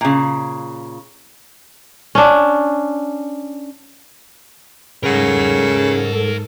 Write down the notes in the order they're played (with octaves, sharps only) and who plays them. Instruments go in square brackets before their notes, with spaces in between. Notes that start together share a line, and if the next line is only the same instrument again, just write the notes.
[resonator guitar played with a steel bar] A#2 C#3
[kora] C#4 D4
[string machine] G#2 A4 [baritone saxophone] C#3 [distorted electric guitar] A#4 F#5